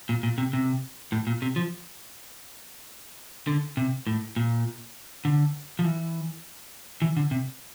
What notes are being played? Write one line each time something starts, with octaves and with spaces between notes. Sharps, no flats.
A#2
A#2
C3
C3
A2
A#2
C3
F3
D3
C3
A2
A#2
D3
F3
E3
E3
D3
C3